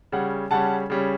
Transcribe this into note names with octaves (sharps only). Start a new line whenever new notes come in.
C#3 G3 C#4 F#5
C#3 G3 C#4 F#5 A5
C#3 G3 C#4